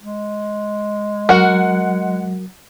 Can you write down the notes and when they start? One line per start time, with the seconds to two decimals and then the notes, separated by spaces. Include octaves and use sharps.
0.03 G#3
1.29 F#3 F#4 A#4 F#5